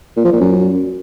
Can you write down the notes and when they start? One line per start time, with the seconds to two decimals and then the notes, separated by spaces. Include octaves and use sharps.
0.16 A#2
0.24 F3
0.32 A#2
0.40 F#2